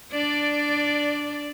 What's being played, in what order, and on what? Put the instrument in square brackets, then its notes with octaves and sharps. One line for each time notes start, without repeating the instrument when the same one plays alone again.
[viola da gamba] D4 D5